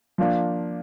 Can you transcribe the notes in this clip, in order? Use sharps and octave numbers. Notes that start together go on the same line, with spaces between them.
F3 A#3 D4